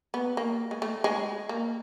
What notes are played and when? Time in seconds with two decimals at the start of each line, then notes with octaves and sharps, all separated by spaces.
0.14 B3
0.37 A#3
0.71 G#3
0.82 A3
1.04 G#3
1.49 A#3